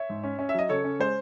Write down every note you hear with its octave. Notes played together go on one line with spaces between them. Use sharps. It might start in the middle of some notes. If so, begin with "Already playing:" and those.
Already playing: C#5 E5
G#2
C#4
C#4
E5
F#3 D#5
C#3 A4 C#5
C#4
G#3 C5